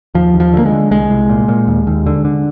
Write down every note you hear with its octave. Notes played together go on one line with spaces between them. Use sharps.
D#2 F3
D#2
F3
D3 A#3
G#3
D3
C2 G#3
C2
A#2
A#2
D#2
D#2
D3
D3